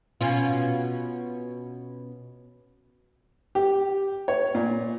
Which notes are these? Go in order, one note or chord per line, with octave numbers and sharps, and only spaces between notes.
B2 C#4 F4
G4
C#5
A#2